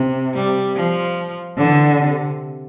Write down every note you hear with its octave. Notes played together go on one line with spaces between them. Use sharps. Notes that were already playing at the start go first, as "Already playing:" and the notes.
Already playing: C3
G3
F3
D3 E3
C3